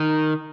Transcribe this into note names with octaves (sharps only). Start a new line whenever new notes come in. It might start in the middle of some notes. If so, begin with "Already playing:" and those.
Already playing: D#3